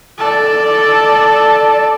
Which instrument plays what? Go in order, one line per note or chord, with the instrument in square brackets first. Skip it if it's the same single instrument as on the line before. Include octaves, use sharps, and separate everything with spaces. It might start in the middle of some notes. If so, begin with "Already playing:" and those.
[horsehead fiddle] A4 D5